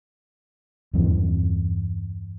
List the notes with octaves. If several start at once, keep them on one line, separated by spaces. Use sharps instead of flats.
E2 G2 E3 C4